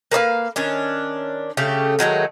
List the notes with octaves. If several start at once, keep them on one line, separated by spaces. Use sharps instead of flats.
A#3 B4 D5 F5
D#3 C#4 D4
C#3 A3 G4
D#3 F#3 G#3 A3